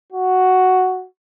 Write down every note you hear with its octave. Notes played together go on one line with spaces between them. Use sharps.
F#4